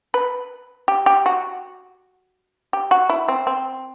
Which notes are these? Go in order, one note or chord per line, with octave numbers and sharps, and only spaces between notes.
B4
G4
G4
F#4
G4
F#4
E4
C4
C4